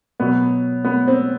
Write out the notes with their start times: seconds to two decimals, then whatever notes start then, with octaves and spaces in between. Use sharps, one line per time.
0.20 B2 F#3 B3
0.84 B3
1.07 C4